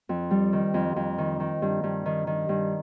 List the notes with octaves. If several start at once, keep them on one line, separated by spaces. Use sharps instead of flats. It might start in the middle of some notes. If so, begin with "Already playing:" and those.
F2
G3
D#3
F2
F2
D#3
D#3
G2
G2
D#3
D#3
G2